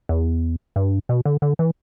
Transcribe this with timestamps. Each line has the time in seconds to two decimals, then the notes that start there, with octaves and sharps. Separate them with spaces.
0.09 E2
0.76 G2
1.09 B2
1.25 D3
1.42 D3
1.59 E3